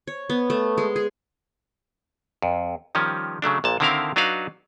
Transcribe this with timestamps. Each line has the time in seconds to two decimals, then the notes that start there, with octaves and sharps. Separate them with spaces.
0.07 C#5
0.30 B3
0.50 A3
0.78 G#3
0.96 G#4
2.42 F2
2.95 D#3 F3 G3 C#4
3.42 C#3 F#3 A3 D4
3.64 A#1 A#2 A5
3.80 D3 D#3 C4 E4 A#4 F5
4.16 F#3 D4 D#4 F#4 B4 F5